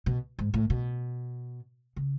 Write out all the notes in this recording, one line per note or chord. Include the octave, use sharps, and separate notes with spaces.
B2
G#2
A2
B2
C#3